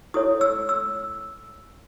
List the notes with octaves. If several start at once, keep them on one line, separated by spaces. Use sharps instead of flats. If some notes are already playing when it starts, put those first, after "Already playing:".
E4 A4 C#5 D#6
E6
E6